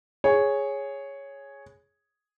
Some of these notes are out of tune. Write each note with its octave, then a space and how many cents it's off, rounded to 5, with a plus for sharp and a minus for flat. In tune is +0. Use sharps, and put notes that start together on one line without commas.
G#4 +0 C#5 +0